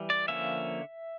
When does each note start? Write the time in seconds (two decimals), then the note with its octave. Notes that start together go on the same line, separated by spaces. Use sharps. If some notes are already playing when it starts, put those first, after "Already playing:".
Already playing: E3 G3
0.10 D5
0.28 D3 F3 A#3 C#4 E5